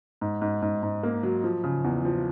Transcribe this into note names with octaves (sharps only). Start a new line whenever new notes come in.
G#2
G#2
G#2
G#2
A#3
F#3
F3
C#3
E2
F3